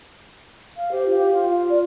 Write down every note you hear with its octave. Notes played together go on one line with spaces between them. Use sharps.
F5
G4 C5
F4
F5
F4
D5